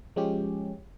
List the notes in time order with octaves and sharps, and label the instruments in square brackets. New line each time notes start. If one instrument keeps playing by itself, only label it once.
[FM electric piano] F3 G#3 C#4 G4